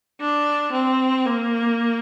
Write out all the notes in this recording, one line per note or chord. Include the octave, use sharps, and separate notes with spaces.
D4
C4
A#3